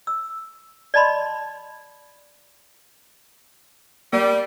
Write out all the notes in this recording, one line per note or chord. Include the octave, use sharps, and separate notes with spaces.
E6
D5 D#5 A5 B5 C6
G3 A#3 D5